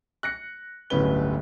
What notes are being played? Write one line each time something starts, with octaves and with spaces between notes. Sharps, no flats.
F#6 A#6 C#7
D1 G1 A2 C#4 B4 G7